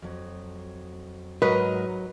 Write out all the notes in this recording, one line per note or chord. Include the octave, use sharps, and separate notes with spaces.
F2 F#3
G#2 F#3 A#4 B4 D#5